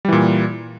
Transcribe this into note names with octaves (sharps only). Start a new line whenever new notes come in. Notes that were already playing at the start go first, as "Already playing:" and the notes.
A#2 E3 G3